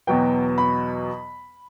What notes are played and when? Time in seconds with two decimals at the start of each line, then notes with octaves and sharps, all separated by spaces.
0.07 E2 B2 F#3 B3 G5
0.58 B5